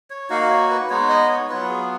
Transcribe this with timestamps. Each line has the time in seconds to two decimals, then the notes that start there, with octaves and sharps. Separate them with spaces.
0.10 C#5
0.30 A#3 D#4 F#4 F5
0.51 C#5
0.70 B4
0.90 G#3 B3 D#4 C#5
1.09 D#5
1.29 C#5
1.49 F#3 B3 F4 B4
1.69 G#4